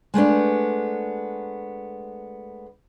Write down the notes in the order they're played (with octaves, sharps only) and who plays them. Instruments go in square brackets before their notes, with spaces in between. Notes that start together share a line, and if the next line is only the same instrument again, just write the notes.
[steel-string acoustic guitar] G#3 A3 B3 D4